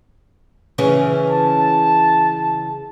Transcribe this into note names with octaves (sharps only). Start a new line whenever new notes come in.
C#3 E3 C#4
A5